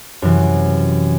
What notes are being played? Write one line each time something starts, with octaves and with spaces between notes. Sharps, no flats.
F#2 C3 E3